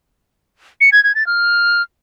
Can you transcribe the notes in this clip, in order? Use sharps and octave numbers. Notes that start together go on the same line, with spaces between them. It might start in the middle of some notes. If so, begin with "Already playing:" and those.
C#7
G#6
G#6
A6
F6